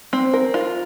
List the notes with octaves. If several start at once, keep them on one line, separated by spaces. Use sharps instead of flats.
C4
A#4
F4